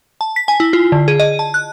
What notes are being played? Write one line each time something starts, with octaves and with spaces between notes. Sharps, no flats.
A5
B6
G#5
E4
F4
D3
G#4
D#5
A5
F#6